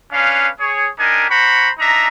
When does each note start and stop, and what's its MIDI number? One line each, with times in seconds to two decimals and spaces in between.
0.12 0.47 61
0.12 0.47 62
0.12 0.47 71
0.12 0.47 77
0.58 0.88 68
0.58 0.88 73
0.98 1.25 62
0.98 1.25 63
0.98 1.25 67
0.98 1.25 70
0.98 1.25 80
1.29 1.69 72
1.29 1.69 78
1.29 1.69 82
1.29 1.69 83
1.29 1.69 85
1.78 2.08 62
1.78 2.08 63
1.78 2.08 76
1.78 2.08 82